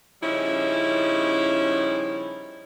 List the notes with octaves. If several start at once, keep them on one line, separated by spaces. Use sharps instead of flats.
C#3 F3 G3 C#4 D#4 E4